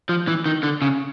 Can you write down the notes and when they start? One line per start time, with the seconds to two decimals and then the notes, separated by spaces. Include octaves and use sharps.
0.09 F3
0.28 E3
0.46 D#3
0.63 D3
0.82 C#3